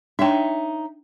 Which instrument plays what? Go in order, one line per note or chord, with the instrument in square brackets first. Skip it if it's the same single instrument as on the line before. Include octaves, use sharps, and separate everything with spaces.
[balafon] D4 G5 [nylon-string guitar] D#4 C#5 E5